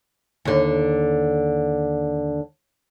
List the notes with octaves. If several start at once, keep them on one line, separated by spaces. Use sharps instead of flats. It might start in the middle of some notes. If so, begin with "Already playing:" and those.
D#2 D3